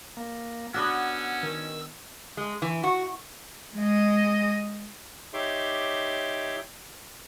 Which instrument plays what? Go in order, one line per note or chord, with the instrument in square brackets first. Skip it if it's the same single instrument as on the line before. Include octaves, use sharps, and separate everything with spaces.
[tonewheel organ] A#3
[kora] B3 D4 F#4 [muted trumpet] C#4 [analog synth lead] F#5 [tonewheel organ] E6
[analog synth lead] D#3
[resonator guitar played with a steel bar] G#3
E3
F#4
[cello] G#3 D#5
[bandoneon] D#4 G4 C#5 E5 C6 D6